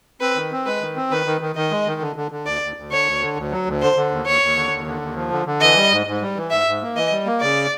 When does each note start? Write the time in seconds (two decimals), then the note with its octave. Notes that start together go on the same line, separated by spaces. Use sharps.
0.21 C4 B4
0.36 D#3
0.52 C4
0.66 G#3 B4
0.81 D#3
0.96 C4
1.11 D#3 B4
1.26 D#3
1.41 D#3
1.56 D#3 D#5
1.71 G#3
1.87 D#3
2.01 D3
2.16 D3
2.31 D3
2.46 D2 D5
2.62 D2
2.76 D2
2.91 D3 C#5
3.06 D2
3.21 D3
3.37 D2
3.52 F#3
3.66 D2
3.81 D3 C5
3.96 D3
4.11 D#2
4.26 D#2 C#5
4.41 D#2
4.56 D3
4.71 D#2
4.86 D3
5.01 D#2
5.16 F3
5.31 D3
5.46 D3
5.61 E3 D#5
5.76 G3
5.91 G#2
6.06 G#2
6.22 G3
6.36 E3
6.51 G#2 E5
6.67 G#2
6.82 A#3
6.96 E3 D#5
7.11 G3
7.26 A#3
7.41 C#3 D5